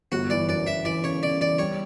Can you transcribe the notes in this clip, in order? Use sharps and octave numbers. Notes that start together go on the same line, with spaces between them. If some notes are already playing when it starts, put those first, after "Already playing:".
G1 F#4
E3 D5
F#2 D5
E3 E5
E3 D5
C#3 C#5
C#3 D5
E3 D5
G3 C#5